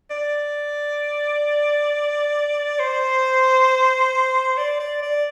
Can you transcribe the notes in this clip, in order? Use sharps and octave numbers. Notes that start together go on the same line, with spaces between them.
D5
C5
D5
D5
D5